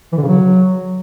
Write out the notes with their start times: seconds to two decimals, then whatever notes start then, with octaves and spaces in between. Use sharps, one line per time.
0.13 E3
0.18 D3
0.23 C#3
0.28 F#3